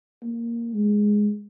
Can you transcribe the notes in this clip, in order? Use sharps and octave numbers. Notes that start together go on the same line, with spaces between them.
A#3
G#3